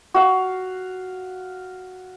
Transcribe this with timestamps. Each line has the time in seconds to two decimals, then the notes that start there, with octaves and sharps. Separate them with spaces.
0.14 F#4 F5